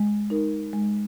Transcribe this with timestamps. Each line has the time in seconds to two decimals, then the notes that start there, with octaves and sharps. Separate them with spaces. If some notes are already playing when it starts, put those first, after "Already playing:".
Already playing: G#3
0.30 D#4 A#4
0.73 G#3